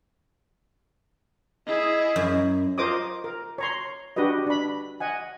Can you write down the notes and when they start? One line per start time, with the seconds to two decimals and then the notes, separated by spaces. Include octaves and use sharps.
1.66 E4 G#4 D#5
2.16 F#2
2.78 F4 A#4 C5 D#5 D6 D#6
3.24 A#4
3.58 C#5 A#5 C6
4.16 D4 F#4 G4 B4 D#5
4.47 D4 B5
5.00 D#5 F#5 G#5